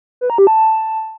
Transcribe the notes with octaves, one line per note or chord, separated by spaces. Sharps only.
B4
A#5
G4
A5